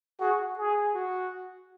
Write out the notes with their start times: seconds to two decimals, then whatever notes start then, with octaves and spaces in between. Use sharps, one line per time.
0.20 F#4 G#4
0.58 G#4
0.94 F#4